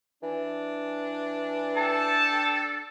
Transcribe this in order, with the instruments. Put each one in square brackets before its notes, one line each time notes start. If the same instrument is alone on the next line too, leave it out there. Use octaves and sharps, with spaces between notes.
[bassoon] E3 [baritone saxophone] D4
[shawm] A4 [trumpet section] G5 A5